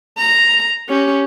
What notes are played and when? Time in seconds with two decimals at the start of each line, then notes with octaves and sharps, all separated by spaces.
0.18 A#5
0.89 C#4 G4